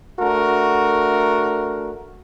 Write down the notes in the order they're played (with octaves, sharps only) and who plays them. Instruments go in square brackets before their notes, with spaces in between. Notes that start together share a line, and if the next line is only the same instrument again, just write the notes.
[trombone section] A3 D4 F#4 A#4